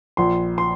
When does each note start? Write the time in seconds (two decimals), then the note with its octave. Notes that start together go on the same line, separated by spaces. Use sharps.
0.17 A#1 C6
0.58 C6